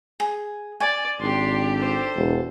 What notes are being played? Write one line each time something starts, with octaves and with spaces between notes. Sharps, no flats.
G#4
D5 G#5
G#1 D4 G4 C6
A4 C5
E1